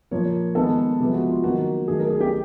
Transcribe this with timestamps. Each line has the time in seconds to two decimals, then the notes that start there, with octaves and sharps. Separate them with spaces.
0.11 A#2 F3 A#3 C#5
0.55 D#3 G#3 B3 A4
1.00 C3 F3 G#3 B3
1.14 F#4
1.29 F4
1.43 D#3 F#3 A#3 F#4
1.88 D#3 F#3 A3 G#4
1.99 A#4
2.10 G#4
2.20 G4